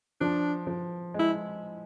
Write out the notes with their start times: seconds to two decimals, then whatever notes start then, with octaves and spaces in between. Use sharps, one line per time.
0.20 F3 D4
0.67 F3
1.14 G#3 E4